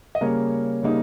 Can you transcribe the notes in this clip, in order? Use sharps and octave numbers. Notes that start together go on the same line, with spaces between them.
D#5
C#3 G3 A#3 C#4 A#4 C#5
C#3 G3 A#3 D#4